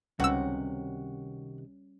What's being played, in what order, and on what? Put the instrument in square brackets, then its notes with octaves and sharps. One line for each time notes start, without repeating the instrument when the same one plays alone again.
[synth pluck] C#2 E6 [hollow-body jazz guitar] C3 D#3 [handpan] G3 C#4 [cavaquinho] F#4